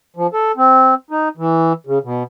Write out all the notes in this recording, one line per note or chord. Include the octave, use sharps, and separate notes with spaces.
F3
A4
C4
D#4
E3
C#3
B2